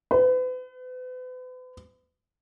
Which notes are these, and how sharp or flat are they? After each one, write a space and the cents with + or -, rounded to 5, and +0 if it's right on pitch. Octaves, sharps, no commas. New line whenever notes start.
B4 +40